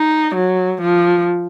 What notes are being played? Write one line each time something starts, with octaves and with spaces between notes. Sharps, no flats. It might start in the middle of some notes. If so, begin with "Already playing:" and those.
Already playing: D#4
F#3
F3